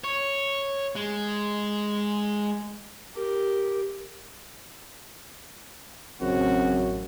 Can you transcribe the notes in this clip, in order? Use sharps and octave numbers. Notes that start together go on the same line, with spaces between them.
C#5
G#3
G4 A#4
A1 F#2 C#3 C4 F#4